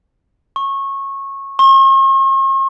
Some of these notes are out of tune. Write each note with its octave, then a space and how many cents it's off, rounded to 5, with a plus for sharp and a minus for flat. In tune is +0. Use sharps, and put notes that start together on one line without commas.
C#6 -20
C#6 -45